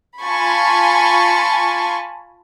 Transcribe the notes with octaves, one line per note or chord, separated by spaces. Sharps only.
F4 G#5 A5 B5 C#6